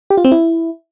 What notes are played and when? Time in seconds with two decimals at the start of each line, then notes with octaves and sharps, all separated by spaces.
0.10 G4
0.17 F4
0.25 C4
0.32 E4